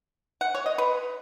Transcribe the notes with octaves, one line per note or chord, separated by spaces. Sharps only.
F#5
C#5
D#5
B4